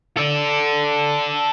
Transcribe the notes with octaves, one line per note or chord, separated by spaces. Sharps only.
A4 D5